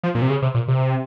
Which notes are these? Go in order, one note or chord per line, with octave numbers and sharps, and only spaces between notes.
F3
A#2
C3
C#3
C3
A#2
C3